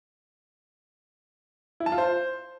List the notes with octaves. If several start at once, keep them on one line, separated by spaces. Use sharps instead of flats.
E4
A5
F4
C5